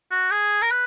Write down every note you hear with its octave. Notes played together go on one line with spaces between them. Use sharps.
F#4
G#4
A#4
B4